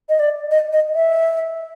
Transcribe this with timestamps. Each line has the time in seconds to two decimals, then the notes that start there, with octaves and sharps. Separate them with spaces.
0.09 D#5
0.20 D5
0.51 D#5
0.73 D#5
0.94 E5